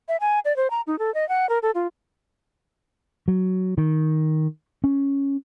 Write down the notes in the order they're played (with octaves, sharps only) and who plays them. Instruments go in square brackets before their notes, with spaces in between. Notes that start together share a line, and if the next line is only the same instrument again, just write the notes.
[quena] E5
G#5
D5
C5
A#5
D#4
A4
D#5
F#5
A#4
A4
F4
[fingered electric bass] F#3
D#3
C#4